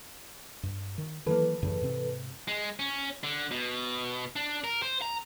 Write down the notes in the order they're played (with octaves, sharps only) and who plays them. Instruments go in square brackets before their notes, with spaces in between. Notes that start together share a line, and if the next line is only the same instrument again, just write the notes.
[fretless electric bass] G2
D#3
[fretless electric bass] D#3 F#3 A#3 [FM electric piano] E3 A4 B4
[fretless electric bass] F#2 A2 C#3
G#2 C3 C4
[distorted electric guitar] G#3
C#4
D3
B2
D4
A#4
C5
A#5